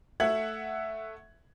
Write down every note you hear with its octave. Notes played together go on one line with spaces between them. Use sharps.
A3 E5 F#5 E6 G#6 F#7